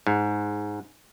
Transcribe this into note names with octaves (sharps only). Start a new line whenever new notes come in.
G#2